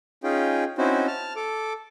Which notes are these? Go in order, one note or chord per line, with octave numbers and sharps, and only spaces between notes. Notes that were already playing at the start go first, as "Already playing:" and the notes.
C#4 D#4 F4 G#4 G5
C4 C#4 D#4 E4 F#4 C5
A5 F6
A4 D6